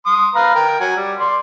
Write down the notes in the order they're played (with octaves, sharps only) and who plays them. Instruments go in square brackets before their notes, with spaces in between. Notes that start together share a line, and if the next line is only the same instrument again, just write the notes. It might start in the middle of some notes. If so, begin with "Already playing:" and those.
[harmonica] C6 D#6
B4 F5 A#5
A#4 G5
F#3 F#5 G#5
G3
D5 C6